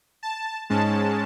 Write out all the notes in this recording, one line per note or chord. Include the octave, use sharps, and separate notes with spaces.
A5
G#2 G#3 C#4 A5